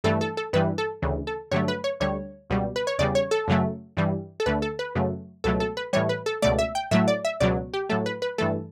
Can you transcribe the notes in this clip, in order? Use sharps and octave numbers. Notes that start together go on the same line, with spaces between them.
G2 E3 A3 A4
A4
A4
G2 E3 G3 B4
A4
D2 C#3 E3
A4
G2 D3 F#3 A3 C#5
B4
C#5
D2 D3 G3 C#5
C#2 B2 G3
B4
C#5
E2 C#3 G3 D5
C#5
A4
F#2 C#3 F#3 A3
G2 E3 G3
A4
D2 D3 A3 B4
A4
B4
F#2 C#3 F#3 A3
C#2 B2 F#3 A3 A4
A4
B4
A2 E3 G3 C#5
B4
A4
C#2 B2 A3 D5
E5
G5
A2 F#3 A3 E5
D5
E5
C#2 B2 F#3 D5
G4
A2 F#3 A3 A4
B4
B4
G2 E3 A3 A4